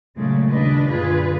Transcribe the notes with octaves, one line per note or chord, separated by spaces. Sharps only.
A#2 C#3 F#3 G#3 A3
D#2 C#3 G3 D4 B4 D#5
F#2 A#2 D3 F4 G#4 B4